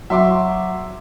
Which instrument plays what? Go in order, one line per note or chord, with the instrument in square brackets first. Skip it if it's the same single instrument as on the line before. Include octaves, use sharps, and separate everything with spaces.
[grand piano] F#3 [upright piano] E5 C6 D6